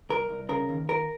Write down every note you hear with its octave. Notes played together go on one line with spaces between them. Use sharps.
C2 A#4
C2
C#3 A#4
D#2
D#2 A#4